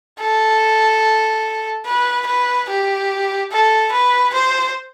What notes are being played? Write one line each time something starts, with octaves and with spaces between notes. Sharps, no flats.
A4
B4
B4
G4
A4
B4
C5